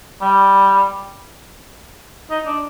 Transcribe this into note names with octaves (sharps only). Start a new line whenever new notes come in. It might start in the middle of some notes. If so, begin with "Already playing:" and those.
G3
D#4
D4